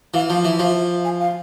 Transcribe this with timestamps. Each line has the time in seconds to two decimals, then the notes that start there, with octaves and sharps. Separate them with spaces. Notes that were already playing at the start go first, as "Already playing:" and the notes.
0.14 E3 F5
0.30 F3
0.44 E3 E5
0.59 F3
1.05 G#5
1.20 F5